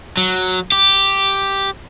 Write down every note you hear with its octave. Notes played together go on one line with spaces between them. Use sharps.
F#3
G4